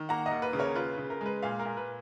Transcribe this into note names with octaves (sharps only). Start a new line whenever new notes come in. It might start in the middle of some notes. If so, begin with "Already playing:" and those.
Already playing: D#3
A#3 F#5 A#5
D#5 F#5
D#2
B4
C#3
A#4 C#5
F4 B4
C#3 B4
A#4
G#3 B4
A#2 F5 G#5
A#4
A#2
B4